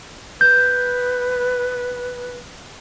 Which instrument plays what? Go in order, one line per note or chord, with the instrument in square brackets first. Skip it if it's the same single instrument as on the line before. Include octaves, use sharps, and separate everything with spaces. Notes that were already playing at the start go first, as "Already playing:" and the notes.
[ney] B4 [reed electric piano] G6